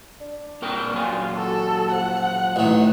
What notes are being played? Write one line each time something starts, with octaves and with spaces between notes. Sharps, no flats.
D4
A#2 A#4 G5
F#2 A#2 F4 G#5
F#4 A4
F3 F#5
A1 D#3